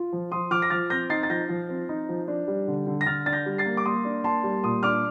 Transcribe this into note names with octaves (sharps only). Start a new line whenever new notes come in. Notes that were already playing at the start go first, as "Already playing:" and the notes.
Already playing: F4
F3
F3 C6 D#6
F3 D6 F6
A#6
F3 F6 A6
C4 G6 A#6
D#4 A6 C7
A6
F3 G6 A#6
F3
C4
D#4
F3
D4
G3
D3
D3
A#6
D3 F6 A6
D4 A6
G6 A#6
G3
A6 C7
A#3
D6
A#3 C6 D#6
D4
A#3 A5 C6
G3
A#2 C6 D#6
D4 D6 F6